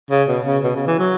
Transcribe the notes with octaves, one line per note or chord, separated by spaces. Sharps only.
C#3
B2
C#3
B2
C#3
E3
F#3